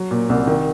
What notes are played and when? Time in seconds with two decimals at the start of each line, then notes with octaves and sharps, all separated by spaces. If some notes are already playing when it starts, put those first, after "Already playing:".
Already playing: F#3
0.11 A#2
0.29 C2
0.47 D#3